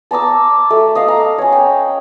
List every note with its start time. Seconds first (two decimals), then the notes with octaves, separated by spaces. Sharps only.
0.11 A5 A#5 D6 E6
0.71 A3
0.95 D#5 F5
1.08 A#5
1.38 C#4 C#5
1.52 G5